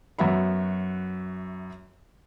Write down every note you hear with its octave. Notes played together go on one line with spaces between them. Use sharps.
F#2 B3 F#4 E5 B5